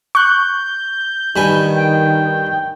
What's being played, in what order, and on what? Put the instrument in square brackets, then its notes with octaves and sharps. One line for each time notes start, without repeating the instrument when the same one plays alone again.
[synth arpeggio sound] C#6 F#6 [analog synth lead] G6
[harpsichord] G2 B4 G#5 [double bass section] D#3
[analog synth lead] G5